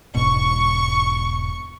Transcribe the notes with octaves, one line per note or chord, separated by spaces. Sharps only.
E1 G#2 B2 C#6